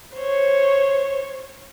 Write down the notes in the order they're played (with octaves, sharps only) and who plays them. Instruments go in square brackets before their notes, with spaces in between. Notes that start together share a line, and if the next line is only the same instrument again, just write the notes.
[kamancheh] C5 C#5